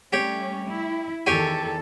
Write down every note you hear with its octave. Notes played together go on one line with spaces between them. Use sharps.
G3 A3 C#4 G4 C#5
E4
E2 D#3 G4 A4 C#5 G#5